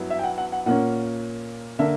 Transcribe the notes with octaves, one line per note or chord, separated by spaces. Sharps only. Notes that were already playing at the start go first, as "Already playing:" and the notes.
Already playing: G2 F#3 B3 E4
E5
G5
F#5
F#5
F#5
A#2 A#3 C#4 F#5
D3 A#3 D4 E5